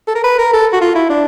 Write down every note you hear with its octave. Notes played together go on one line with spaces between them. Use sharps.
A4
A#4
B4
A#4
A4
F#4
F4
E4
D4